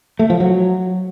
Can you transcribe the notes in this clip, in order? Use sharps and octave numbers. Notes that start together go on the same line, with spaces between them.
A3
F3
F#3